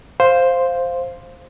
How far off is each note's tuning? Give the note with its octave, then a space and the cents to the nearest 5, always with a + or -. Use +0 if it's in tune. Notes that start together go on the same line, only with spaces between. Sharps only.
C5 +0 F5 +0